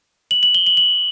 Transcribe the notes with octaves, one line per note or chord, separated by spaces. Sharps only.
F#7
F#7
G7
F#7
F#7